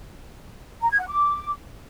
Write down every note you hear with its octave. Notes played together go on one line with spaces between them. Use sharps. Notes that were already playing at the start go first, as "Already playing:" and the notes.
A#5
G#6
F#5
D6